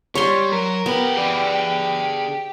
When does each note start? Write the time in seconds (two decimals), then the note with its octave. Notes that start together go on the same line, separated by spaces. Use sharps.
0.15 G3 C#5 C6
0.52 F#3 A#4 C#6
0.86 D3 B3 G4 B5
1.17 G#4 D5